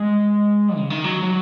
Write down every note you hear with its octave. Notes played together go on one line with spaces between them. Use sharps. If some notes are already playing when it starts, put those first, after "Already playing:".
Already playing: G#3
C#3
D#3
F#3
F#3